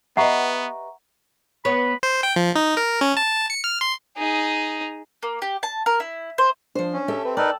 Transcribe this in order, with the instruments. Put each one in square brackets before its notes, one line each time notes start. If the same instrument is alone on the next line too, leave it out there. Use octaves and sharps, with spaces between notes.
[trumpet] B3 [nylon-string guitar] G4 B4 D#5 [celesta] E5 A#5 C#6 [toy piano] F#5
[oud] B3 C#5 [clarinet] B5
[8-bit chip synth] C5
G5
F3
D#4
A#4
C#4
A5
C#7
F6
C6
[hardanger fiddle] D#4 G#4
[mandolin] A#3
G4
A5
A#4
E4
C5
[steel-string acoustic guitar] F3 C5 [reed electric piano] D4
[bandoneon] C#4
[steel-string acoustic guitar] G4 A4 E5
[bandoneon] C4 [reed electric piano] B4
[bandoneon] D#4 A#4 B4 [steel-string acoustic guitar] D5 [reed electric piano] G5 A5 E6